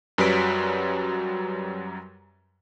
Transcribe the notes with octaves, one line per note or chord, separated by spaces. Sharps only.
F#2 F#3 G3 B4 B6 D7